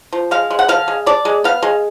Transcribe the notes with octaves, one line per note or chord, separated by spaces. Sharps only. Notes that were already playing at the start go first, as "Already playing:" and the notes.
F3
G#3 F5
G#3
F#5
D3 F5
G#3
D4 D5
G#3
B3 F5
G#3